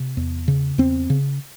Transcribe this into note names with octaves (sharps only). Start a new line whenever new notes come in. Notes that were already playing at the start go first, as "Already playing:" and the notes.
Already playing: C3
E2
C#3
E2 C4
C#3